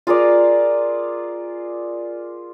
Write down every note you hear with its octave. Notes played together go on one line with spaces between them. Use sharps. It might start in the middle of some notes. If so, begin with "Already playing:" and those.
F4 G#4 A#4 D5